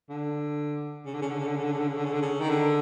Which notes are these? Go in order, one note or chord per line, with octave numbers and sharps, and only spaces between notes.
D3
C#3
D3
C#3
D3
C#3
D3
C#3
D3
C#3
D3
C#3
D3
C#3
D3
C#3
D#3
D3